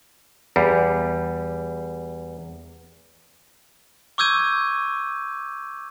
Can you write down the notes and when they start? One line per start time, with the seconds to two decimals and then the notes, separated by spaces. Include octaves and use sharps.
0.56 E2 G3
4.18 C#6 D6 E6 G6 G#6 D#7